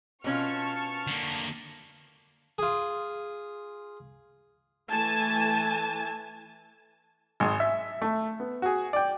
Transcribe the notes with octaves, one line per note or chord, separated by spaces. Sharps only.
B2 C#4 F4 A5 C#6 F6
D3 A#3
F4 G#4
E3 A3 G#5 A5
G#1 G#3 G#4
E5
A3
B3
F#4 G#4
D5 G5